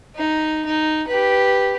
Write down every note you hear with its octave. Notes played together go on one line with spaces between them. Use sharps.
D#4
D#4
G4 B4